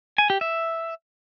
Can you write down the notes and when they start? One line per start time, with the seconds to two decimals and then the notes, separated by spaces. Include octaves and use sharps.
0.18 G#5
0.30 G4
0.41 E5